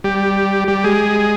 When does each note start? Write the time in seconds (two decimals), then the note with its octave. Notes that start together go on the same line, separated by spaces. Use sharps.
0.04 G3 G4
0.68 G3 G4
0.84 G#3 G#4